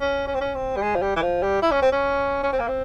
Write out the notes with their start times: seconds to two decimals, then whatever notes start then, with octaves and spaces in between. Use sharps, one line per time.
0.01 C#4
0.27 C#4
0.34 C4
0.41 C#4
0.55 C4
0.76 G3
0.82 G#3
0.95 F3
1.02 G3
1.16 E3
1.22 F3
1.43 G3
1.62 E4
1.71 C#4
1.82 C4
1.92 C#4
2.43 C#4
2.52 C4
2.59 A#3
2.68 C4